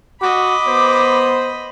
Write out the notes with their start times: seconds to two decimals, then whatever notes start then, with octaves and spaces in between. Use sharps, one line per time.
0.21 F#4 D#5 B5 D6
0.67 B3 C5